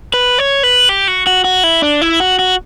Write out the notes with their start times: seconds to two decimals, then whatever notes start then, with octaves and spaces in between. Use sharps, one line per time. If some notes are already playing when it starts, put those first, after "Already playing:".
0.14 B4
0.39 C#5
0.63 B4
0.89 G4
1.08 F#4
1.27 F#4
1.44 F#4
1.64 E4
1.82 D4
2.01 E4
2.20 F#4
2.39 F#4